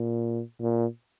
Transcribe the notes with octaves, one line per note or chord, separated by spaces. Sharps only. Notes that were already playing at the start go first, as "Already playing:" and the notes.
Already playing: A#2
A#2